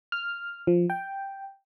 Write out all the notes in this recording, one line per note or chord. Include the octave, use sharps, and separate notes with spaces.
F6
F3
G5